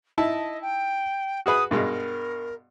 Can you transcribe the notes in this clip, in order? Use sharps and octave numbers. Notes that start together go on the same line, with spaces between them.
D#4 E4 D#5 A5
G5
F#4 G#4 B4 D#6
G2 B2 G#3 A#4